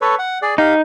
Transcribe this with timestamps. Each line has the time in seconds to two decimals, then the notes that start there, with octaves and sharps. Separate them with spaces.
0.02 A4 B4 C#5
0.19 F#5
0.42 G#4 D5
0.58 D#4 G4 F5